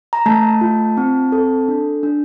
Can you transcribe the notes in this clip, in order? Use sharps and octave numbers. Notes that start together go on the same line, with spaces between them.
A#5
A3 A5
F4
C4
A4
D4
D4